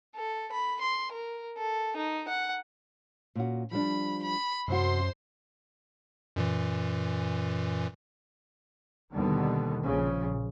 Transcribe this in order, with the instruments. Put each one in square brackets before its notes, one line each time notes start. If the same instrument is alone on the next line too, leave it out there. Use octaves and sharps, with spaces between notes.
[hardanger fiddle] A4
B5
C6
A#4
A4
D#4
F#5
[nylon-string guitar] A#2 C#4 F#4
[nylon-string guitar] F3 G3 D4 [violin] B5
[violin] B5
[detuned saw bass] F#2 [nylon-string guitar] C3 F#4 [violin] C5 C6
[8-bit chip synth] F#2 A#2 E3
[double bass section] D#2 B2 D3 D#3 G3 B3
A#1 A#2 C#3 F3